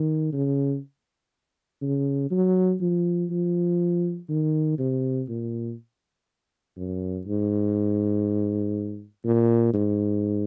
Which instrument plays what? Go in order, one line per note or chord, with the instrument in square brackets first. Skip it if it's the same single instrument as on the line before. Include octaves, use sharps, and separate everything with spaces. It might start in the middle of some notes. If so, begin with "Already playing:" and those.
Already playing: [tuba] D#3
C#3
C#3
F#3
F3
F3
D#3
C3
A#2
F#2
G#2
A#2
G#2